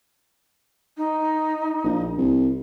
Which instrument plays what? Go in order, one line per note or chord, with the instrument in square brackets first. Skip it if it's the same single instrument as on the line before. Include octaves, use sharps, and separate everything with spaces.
[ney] D#4
[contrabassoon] A#1
C2